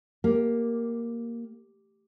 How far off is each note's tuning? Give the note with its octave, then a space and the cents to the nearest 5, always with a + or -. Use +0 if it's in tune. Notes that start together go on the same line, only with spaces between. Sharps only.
A#3 +0 G4 +0